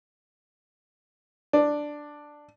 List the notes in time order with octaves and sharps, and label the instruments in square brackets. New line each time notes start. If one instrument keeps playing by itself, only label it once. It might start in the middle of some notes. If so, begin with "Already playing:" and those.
[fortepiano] D4